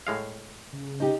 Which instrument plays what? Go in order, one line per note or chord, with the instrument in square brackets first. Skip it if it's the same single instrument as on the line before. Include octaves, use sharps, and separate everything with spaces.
[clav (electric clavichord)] A2 G#3 F5
[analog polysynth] C#3
[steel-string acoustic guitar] D#4 G4